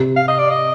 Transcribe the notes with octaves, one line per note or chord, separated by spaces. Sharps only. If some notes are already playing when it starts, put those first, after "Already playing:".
Already playing: C3
F5
D#5
D5
D#5